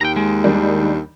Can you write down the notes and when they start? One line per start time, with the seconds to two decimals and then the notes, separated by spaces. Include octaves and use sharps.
0.01 D#2 G5 A#5
0.16 G#3
0.44 D#3 G3 D4